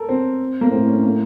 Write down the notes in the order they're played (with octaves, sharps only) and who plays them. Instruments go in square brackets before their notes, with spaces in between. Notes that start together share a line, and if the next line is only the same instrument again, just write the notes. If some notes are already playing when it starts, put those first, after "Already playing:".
Already playing: [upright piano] A4 A#4
C4
A#3
[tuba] A2 [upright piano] C4
[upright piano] C#4
A#3